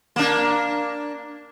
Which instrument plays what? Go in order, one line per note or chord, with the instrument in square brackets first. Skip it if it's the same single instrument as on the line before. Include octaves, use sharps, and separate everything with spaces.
[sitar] A#3 D4